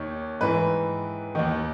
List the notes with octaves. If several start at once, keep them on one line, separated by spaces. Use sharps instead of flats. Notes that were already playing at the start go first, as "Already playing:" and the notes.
Already playing: D#2 D#3 C#5
G#2 E3 B4
D#2 D#3